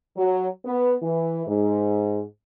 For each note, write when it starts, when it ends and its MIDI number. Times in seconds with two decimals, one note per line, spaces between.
0.17 0.47 54
0.65 0.93 59
1.02 1.42 52
1.47 2.21 44